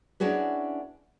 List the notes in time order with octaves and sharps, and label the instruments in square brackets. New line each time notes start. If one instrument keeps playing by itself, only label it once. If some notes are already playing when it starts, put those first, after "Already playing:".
[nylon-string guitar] C#4 D4 E4 F#4 G#4 B4